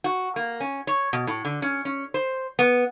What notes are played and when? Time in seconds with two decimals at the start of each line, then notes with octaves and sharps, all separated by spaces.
0.04 F#4
0.36 A#3
0.60 C#4
0.87 C#5
1.13 B2
1.27 A2
1.45 D3
1.62 C#4
1.85 C#4
2.14 C5
2.59 B3